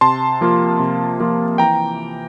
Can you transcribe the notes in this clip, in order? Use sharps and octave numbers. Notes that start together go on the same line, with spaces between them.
C3 A5 C6
F3 A#3 F4
C3
F3 A#3 F4
E3 G5 A#5